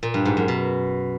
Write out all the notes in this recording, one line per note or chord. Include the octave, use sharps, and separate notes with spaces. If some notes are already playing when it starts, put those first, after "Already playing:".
A#2
G2
G#2
F#2
B2